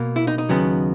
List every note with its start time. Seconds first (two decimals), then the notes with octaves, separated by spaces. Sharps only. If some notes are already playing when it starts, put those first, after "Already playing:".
Already playing: B2 A#3
0.16 E4
0.27 D#4
0.38 D#4
0.49 D#2 C#3 F#3 B3